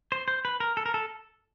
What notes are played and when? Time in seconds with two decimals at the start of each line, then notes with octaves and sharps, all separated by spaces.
0.12 C5
0.28 C5
0.45 B4
0.60 A#4
0.77 A4
0.86 A#4
0.94 A4